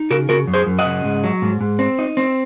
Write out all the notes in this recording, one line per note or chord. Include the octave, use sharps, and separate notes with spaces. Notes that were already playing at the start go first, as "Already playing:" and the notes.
Already playing: D#4
C#3 F#4 A#4
C#3 F#4 A#4
F#2
G#4 C5
F#2
D#5 F#5
C#3
G#2
F#3
G#2
G#2
C4
D#4
C4